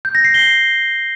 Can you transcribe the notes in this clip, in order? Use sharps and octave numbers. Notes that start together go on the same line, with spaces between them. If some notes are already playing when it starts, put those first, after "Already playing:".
G6
A#6
C7
G7